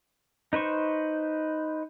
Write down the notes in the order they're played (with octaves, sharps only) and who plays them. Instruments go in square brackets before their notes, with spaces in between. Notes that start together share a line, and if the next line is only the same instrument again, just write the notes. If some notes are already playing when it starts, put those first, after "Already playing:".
[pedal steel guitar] D#4 B4 C5 C#6